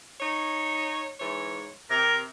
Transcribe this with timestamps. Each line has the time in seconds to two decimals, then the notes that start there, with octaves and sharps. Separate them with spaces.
0.20 D#4 C#5
1.19 G#2 E3 C#5
1.90 C3 A#4